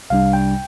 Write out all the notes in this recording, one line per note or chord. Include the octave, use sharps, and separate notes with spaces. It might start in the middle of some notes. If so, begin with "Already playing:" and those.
C2 C3 G3 D4 F5
G5